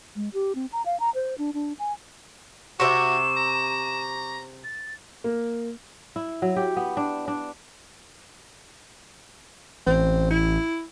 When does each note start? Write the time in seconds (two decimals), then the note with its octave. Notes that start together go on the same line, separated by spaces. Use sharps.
0.16 G#3
0.33 G4
0.55 C4
0.72 A#5
0.85 F5
1.00 A#5
1.15 C5
1.38 D4
1.53 D4
1.79 G#5
2.80 C3 F#4 C5 E5 C#6 D6 E7
3.37 A#5
4.64 A6
5.24 A#3
6.16 E4
6.42 F#3
6.56 G4
6.77 B3
6.97 D4
7.28 D4
9.87 A1 C4
10.31 E4